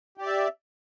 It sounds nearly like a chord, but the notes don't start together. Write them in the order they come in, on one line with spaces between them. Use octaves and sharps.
G4 D5 E5